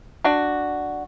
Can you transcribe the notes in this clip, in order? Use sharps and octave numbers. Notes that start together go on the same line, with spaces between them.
D4 F#4